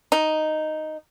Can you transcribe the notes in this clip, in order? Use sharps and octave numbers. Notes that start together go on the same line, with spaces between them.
D#4